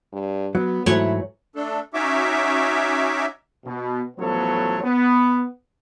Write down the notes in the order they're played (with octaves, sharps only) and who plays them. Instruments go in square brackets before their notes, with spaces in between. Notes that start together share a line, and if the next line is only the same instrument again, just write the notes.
[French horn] G2
[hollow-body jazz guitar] F#3 [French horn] B3
[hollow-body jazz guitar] G#2 E3 A3 [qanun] F#3 C#5 F#5 [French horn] E4
[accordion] A3 D4 A4
C#4 D#4 F#4 C#5 E5 D6
[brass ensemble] B2
A1 F3 F#3 B3 A4 C#5
B3